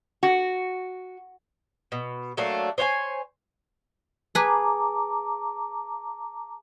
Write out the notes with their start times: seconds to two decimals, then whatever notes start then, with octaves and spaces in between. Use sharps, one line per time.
0.23 F#4
1.92 B2
2.37 F#3 A3 A#3 D4
2.78 C5 C#5 F#5 G#5
4.35 G#4 B4 A5 A#5 D6